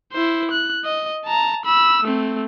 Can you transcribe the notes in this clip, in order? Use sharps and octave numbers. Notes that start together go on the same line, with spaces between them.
E4 C5
F#6
D#5
A5 A#5
B5 E6
A3 C4